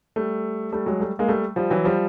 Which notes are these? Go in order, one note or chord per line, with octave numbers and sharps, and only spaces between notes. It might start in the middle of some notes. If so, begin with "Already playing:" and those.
G3 A3
G3 A3
F#3 G#3
G3 A3
G#3 A#3
G3 A3
F3 G3
E3 F#3
F3 G3